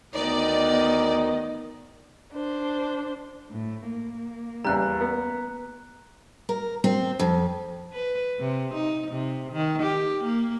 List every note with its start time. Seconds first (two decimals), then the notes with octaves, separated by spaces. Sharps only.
0.14 D2 D#3 B3 D#4 D5 D#5
2.33 D4 C5
3.51 A2
3.90 A#3
4.65 E2 C#3 G3 A#5 F#6
5.01 B3
6.49 A#4
6.84 C4
7.19 F2
7.93 B4
8.39 C3
8.74 D#4
9.11 C3
9.53 D#3
9.82 G4
10.24 A#3